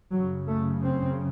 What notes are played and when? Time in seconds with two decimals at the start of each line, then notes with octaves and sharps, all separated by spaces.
0.12 F#2 C#3 F#3
0.47 A3
0.83 C4